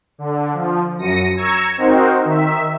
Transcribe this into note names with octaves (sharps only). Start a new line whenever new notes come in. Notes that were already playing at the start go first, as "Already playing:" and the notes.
D3
F3
F#2 A#6 C#7 D#7
A#5 C#6 E6 G#6
C4 D#4 F#4 A#4 C5
D#3 E5